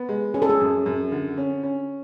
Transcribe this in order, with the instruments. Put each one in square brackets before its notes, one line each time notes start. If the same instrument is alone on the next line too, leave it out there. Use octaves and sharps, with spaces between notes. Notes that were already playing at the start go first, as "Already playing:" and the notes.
Already playing: [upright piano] B3
G#3
[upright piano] C#4 [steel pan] G#4
[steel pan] A4
G#4
[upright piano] F#2
F#2
D3
C#4
C#4